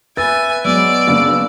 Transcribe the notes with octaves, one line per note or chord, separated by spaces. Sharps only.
B4 E5 G#5 A6
F#3 G#3 B3 D5 E6
F#1 G2 C#3 A#3